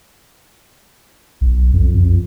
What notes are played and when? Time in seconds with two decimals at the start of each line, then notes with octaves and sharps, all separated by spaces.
1.41 B1
1.73 F2
1.95 F2